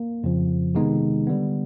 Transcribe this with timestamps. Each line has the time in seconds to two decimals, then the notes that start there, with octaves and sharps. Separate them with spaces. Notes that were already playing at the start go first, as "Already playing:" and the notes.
Already playing: A#3
0.24 F2 C#3 F3
0.75 C3 D#3 G#3 B3 D#4
1.27 D3 G3 B3